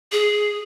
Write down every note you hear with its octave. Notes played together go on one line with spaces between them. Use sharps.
G#4